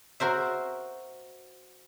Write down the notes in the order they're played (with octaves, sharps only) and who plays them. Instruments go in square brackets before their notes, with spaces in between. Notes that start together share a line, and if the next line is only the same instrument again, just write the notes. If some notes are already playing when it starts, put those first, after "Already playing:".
[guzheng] F#4 A#4 C5 E5